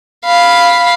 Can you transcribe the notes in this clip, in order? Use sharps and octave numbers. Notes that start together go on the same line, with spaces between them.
F5 B5